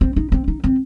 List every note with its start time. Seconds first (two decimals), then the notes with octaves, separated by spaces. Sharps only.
0.01 C4
0.16 D#4
0.32 C4
0.48 D#4
0.64 C4